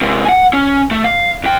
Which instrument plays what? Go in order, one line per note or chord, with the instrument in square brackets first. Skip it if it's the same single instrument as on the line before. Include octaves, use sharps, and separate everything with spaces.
[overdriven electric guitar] C3 G#3
F#5 G#5
C#4
A3
F5
F2 G5